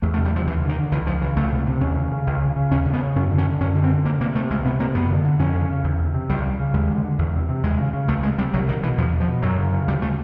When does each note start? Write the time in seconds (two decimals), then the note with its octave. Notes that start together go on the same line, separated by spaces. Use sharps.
0.02 E2 A3
0.14 A3
0.17 C3
0.25 G3
0.33 C3 F3
0.47 D#2 E3
0.62 D3
0.69 D#3
0.77 D3
0.91 C#2 E3
1.06 C#3 F3
1.21 C#3 E3
1.37 C#2 A3
1.52 C3
1.67 C3
1.81 D#2 C#4
1.96 C#3
2.12 C#3
2.27 C#2
2.41 C#3
2.56 C#3
2.71 D#2 C#4
2.86 C#3
2.93 B3
3.01 C#3
3.16 F#2 C#4
3.31 D3
3.38 C#4
3.45 D3
3.60 F#2 C#4
3.75 D3
3.83 C4
3.91 D3
4.05 D2 A#3
4.20 C3 A#3
4.35 C3 A3
4.50 C#2 G#3
4.65 C3 B3
4.79 C3 A#3
4.95 F#2 B3
5.10 D3
5.25 D3
5.39 F2 C#4
5.55 C#3
5.70 C#3
5.84 E2
5.99 C3
6.14 C3
6.29 C#2 G3
6.44 C#3
6.59 C#3
6.74 D#2 G#3
6.89 D3
7.04 D3
7.19 E2
7.33 C3
7.49 C3
7.63 D#2 G#3
7.78 C#3
7.93 C#3
8.08 C#2 A3
8.23 C3 G#3
8.38 C3 G3
8.53 C2 F#3
8.68 B2 D#3
8.83 B2 E3
8.98 E2 F3
9.13 B2
9.20 F3
9.28 B2
9.42 F#2 F#3
9.58 C#3
9.72 C#3
9.88 D2 G3
10.02 C#3 A3